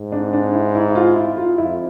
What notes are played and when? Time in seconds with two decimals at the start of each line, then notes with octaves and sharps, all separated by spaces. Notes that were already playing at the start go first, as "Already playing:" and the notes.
Already playing: G#2
0.12 D4
0.33 D4
0.53 E4
0.75 E4
0.90 E4
0.95 F4
1.16 E4
1.37 F4
1.58 F2 E4